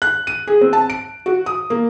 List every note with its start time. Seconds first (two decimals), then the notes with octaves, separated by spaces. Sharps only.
0.02 F#6
0.27 D#7
0.47 G#4
0.61 C4
0.73 A5
0.90 D7
1.26 F#4
1.46 D#6
1.70 A#3